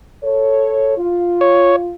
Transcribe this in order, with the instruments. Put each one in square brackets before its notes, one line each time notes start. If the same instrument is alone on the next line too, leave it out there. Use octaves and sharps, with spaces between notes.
[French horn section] A4 C#5
F4
[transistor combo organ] C#5